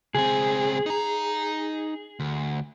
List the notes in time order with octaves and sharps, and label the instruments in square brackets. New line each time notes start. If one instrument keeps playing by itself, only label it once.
[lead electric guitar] C#2 C4 [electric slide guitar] G#4
[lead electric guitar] D#4 A#5
D2